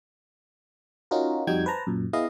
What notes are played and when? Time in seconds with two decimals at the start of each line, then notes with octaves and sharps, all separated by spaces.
1.11 C#4 D#4 F4 F#4 A#4
1.47 F2 G3 D#4 F#4 G5 G#6
1.66 B4 C5 A5 A#5
1.87 F#2 A#2
2.13 B3 E4 G#4 D#5 F5